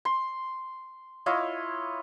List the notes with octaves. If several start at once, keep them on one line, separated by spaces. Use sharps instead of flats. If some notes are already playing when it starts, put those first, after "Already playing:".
C6
E4 F4 C#5 D#5